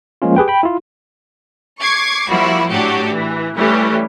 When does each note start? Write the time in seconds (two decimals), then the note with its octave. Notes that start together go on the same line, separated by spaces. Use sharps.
0.22 F3 G#3 A#3 C#4 F4
0.36 G4 G#4 B4 G5
0.48 G5 B5
0.63 E4 F4
1.82 C#6 D6 G#6 C7
2.29 F3 G3 A#3 E4 F#4
2.71 A2 F#3 D4 F#4 G4
3.12 E3
3.56 E3 G3 A3 C#4 G4